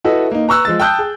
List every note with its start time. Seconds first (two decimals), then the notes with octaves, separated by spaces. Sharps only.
0.04 E4 F#4 A4 B4 D#5 E5
0.32 A#3 D#4
0.48 B4 A#5 C#6 E6 F#6
0.65 F3 G#3 A6
0.80 G5 A5 D#6 E6 F#6 G6
0.98 G#4